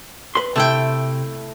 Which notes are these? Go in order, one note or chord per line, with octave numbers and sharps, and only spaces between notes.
B4 C6
C3 A3 E4 G5